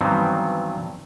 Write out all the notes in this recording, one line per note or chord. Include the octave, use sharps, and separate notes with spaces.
G2 D#3 E3 F#3 B3 C4